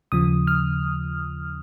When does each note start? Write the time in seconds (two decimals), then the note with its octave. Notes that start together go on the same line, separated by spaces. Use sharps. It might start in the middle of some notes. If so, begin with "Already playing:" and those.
0.12 D#2 C#3 F3 D#6
0.47 F6